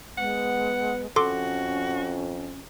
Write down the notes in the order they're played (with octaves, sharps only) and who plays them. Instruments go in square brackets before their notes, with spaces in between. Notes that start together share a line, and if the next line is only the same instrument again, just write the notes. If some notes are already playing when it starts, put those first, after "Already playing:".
[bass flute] G#3 [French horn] B3 [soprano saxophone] F#5
[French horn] F2 [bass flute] C#4 [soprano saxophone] F#4 [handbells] A4 C6 D6